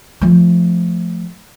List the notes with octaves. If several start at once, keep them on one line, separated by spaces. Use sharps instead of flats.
F3 A3